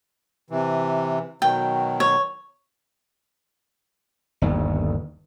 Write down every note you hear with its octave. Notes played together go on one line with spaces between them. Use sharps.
C3 E3
B2 D#3 F#3 G5
C#5
G1 D#2